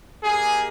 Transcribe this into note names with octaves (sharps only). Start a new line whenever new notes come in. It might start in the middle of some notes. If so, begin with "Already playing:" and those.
A#3 D#4 G4 G#4